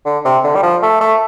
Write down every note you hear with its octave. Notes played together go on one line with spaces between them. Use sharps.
D3
C3
D3
G3
F3
A3
A3